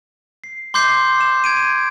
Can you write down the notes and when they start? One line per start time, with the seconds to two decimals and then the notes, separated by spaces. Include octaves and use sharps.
0.44 C7
0.74 C6 D6 G6 C7
1.21 E7
1.44 G#6 D7 D#7